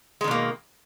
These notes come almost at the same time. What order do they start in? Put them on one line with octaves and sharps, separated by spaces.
G#3 D#3 B2 A#3